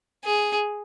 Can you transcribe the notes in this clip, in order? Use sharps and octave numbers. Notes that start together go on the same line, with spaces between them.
G#4